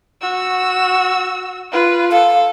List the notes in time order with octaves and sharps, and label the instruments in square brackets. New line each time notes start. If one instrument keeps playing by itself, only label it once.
[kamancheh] F#4 E6
F4 B4
[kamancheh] A4 [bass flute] F5